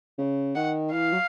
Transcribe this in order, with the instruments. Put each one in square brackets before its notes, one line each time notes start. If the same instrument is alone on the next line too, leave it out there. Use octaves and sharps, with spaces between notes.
[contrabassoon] C#3
[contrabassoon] D#3 [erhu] F#5
[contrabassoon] E3 [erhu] F5
[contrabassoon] F#3